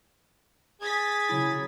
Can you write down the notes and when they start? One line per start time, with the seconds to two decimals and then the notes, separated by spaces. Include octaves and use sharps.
0.82 G#4 G#6 A6 B6
1.29 C#3 F#3 E4